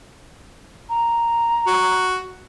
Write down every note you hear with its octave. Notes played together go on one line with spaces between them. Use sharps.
A#5
F#4